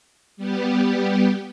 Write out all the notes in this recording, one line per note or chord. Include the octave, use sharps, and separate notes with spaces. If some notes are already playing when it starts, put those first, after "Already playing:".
G3 B3 G4